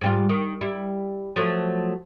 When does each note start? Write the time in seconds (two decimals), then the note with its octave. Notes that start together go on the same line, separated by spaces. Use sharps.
0.01 G#2 G3 F4
0.29 D#3
0.61 G3 E4
1.36 F3 F#3 A3